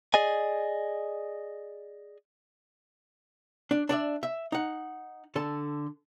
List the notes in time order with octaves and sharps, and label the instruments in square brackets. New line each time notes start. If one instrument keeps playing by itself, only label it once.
[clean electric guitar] G#4 D5 D#5 G#5
[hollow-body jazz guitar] D4
D4 D5 E5
E5
D#4 F#5
D3 A4 A5